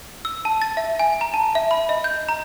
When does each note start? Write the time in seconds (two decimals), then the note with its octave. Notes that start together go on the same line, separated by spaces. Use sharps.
0.25 E6
0.45 A5
0.62 A6
0.77 E5
0.99 G#5
1.21 A#5
1.34 A5
1.55 E5
1.71 B5
1.89 D#5
2.04 G6
2.29 A#5